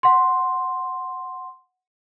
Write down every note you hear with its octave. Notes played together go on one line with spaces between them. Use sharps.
F#5 C6